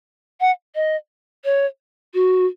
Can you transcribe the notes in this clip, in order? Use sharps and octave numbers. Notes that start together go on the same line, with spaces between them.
F#5
D#5
C#5
F#4